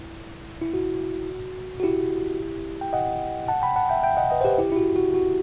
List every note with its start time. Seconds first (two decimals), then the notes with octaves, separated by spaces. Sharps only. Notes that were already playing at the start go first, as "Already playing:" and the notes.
Already playing: E4
0.62 E4
0.74 F#4
1.80 F#4
1.83 E4 G4
2.81 G5
2.93 D#5 F#5
3.48 F#5 A5
3.62 G5 B5
3.76 F#5 A5
3.89 E5 G5
4.03 E5 G5
4.17 D#5 F#5
4.31 B4 D#5
4.41 C5
4.45 G4 B4
4.58 E4 G4
4.72 E4
4.76 F#4
4.96 F#4
5.14 F#4